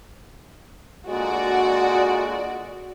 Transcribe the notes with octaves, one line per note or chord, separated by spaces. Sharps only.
A#2 D3 G#3 F#4 D5